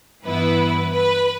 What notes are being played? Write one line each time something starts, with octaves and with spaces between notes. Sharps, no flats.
G2 E3 B3 E4 B4
B4